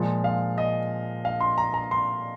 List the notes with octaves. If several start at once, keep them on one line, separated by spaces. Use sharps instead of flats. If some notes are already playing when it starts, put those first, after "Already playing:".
Already playing: A#2 F3 G#3
F5
D#5
F5
C6
A#5
A#5
C6